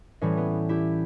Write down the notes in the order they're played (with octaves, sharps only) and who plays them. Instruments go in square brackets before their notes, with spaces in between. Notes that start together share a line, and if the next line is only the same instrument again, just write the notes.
[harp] A2 E3 G3 C#4
B3
E4 G4